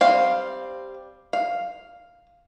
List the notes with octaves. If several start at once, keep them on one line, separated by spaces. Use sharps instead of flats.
G3 C4 F5
F5